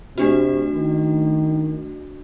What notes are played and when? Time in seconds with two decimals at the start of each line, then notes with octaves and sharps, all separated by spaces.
0.18 C3 A3 D4 F#4
0.75 D#3